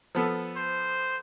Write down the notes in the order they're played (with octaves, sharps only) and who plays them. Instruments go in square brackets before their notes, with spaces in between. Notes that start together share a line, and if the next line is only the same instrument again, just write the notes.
[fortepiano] F3 B3 A4
[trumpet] C5